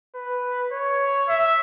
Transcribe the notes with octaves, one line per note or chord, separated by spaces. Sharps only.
B4
C#5
E5